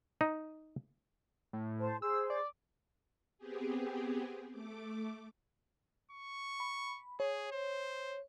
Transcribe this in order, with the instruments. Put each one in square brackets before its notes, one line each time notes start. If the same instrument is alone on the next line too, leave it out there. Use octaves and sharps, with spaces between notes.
[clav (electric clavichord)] D#4
[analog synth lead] A2
[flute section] C5 A5
[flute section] G#4 C5 [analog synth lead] E6
[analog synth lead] D5
[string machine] B3 C4 G4 G#4
A3 D6
[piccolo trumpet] C#6
[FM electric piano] B5
[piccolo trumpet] G#4 [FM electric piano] C#5
[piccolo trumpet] C5